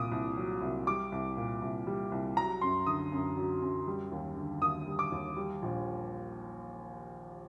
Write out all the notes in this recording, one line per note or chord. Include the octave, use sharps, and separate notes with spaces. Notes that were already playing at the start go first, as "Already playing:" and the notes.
Already playing: C2 A#2 D6 D#6
C2
F#3
C2
G3 D6
C2
A#2
C2
G3
C2
F#3 A#5
F#2 C6
D3 D#6
F#2
F#3
F#2
G3
D#2
D3
D#2 D#6
G3
D6
D#2
G3
A#1